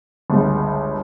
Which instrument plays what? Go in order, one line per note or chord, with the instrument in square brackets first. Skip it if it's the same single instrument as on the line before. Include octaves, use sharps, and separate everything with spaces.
[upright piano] G1 C#2